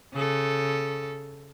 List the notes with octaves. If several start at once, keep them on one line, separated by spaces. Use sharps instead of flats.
C#3 A4